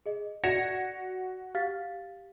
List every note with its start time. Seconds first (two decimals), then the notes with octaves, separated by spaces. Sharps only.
0.06 G#4 D#5
0.44 F#4 D5 G#6 A#6 C#7 E7 F7
1.55 G4 F5 A6 B6